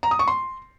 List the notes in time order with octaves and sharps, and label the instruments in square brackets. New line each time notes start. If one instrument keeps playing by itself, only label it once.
[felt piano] A#5
D#6
C#6
C6